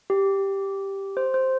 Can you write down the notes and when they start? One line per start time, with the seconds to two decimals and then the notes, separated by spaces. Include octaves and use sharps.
0.10 G4
1.17 C5
1.34 C5